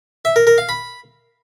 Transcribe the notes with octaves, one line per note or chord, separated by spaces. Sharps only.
E5
A#4
A#4
F5
B5